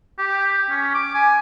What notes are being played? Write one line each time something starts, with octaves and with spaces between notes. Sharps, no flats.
G4
C#4
D6
G#5